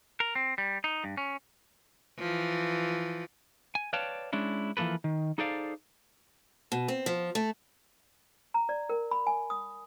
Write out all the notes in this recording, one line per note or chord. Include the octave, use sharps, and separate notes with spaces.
A#4
C4
G3
D#4
G2
C#4
E3 F3
G#5
B4 C#5 D5 F5 G5 A5
G#3 C#4 D4 E4
E3 F3 A#3 A4 B4
D#3
D#4 G#4 A4 C5 D5 F5
B2
C4
F3
A3
A#5
D5
A#4
B5
G#5
D#6